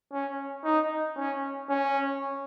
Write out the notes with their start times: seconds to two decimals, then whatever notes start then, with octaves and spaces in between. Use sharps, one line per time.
0.13 C#4
0.64 D#4
1.17 C#4
1.69 C#4